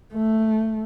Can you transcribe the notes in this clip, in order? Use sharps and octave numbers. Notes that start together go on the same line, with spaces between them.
A3